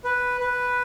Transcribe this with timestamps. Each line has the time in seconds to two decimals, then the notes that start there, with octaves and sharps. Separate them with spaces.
0.04 B4
0.40 B4